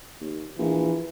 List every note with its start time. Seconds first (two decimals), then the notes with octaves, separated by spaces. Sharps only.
0.20 D#2
0.58 A#1 E3